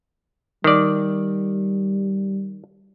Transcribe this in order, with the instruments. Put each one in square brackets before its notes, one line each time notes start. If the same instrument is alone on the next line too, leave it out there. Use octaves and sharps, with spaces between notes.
[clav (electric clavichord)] D#3 D5 [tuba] G3